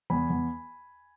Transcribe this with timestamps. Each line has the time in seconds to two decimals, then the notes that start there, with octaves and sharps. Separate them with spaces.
0.10 E2 G#5 B5
0.30 E2